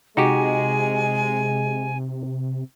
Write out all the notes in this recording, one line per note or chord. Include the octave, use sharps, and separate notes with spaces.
C3 G#3 D#4 F#4 G4 G#5